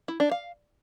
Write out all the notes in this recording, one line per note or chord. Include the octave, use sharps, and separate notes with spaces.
E4
D4
F5